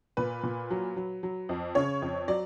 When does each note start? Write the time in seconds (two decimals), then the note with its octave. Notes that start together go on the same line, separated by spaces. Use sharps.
0.17 A#2 B4
0.43 A#2
0.71 F#3
0.96 F#3
1.23 F#3
1.49 F2
1.75 C#3 C#5
2.02 F2
2.28 F#3 D5